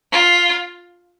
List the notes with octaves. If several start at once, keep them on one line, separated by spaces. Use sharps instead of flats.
F4